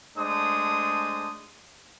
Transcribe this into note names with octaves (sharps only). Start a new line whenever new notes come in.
G#3 A3 D4 C5 D#6